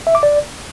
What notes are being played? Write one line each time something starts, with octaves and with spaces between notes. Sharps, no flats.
E5
D6
D5